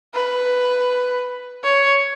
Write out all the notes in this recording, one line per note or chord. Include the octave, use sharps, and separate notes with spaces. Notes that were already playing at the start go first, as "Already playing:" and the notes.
B4
C#5